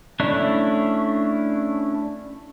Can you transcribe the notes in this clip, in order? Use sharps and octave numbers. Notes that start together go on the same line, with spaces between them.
A3 C#4 D4 E4